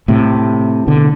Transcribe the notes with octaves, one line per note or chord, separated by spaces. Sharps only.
A2 C3
B2 D3